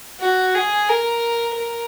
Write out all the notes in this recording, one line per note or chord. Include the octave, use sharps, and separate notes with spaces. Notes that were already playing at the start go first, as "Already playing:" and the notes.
F#4
G#4
A#4
A#4